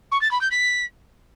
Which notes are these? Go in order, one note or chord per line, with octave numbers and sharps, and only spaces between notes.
C#6
A6
B5
G6
B6